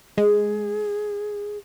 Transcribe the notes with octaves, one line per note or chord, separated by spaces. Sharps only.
G#3 G#4